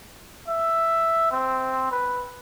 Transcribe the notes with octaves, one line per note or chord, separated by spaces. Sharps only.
E5
C4
B4